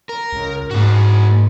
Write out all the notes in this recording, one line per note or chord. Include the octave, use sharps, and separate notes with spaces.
A#4
C#2
G#2 A#3 F#4